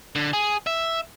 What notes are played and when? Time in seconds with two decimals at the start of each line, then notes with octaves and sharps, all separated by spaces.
0.15 D3
0.33 G#4
0.67 E5